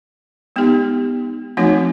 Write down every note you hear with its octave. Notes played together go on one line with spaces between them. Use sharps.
G#3 B3 D#4 G4
F3 A3 C4 D#4 F#4